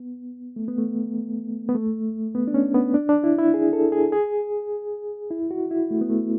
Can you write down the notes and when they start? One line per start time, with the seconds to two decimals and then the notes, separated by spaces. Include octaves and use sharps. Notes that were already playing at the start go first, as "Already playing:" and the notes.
Already playing: B3
0.56 A3
0.68 B3
0.78 A3
1.69 B3
1.75 A3
2.35 B3
2.47 D4
2.54 C#4
2.75 B3
2.94 D4
3.09 D4
3.24 E4
3.39 E4
3.54 G#4
3.73 A4
3.92 G#4
4.12 G#4
5.31 E4
5.51 F#4
5.71 E4
5.91 A3
6.01 B3
6.10 A3